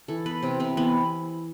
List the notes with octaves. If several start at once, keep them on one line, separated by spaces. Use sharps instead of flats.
E3 A4
B3 B4
C3 C4
C3 C4
E3 B3